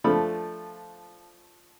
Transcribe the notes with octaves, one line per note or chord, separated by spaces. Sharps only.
F3 A3 D4 B5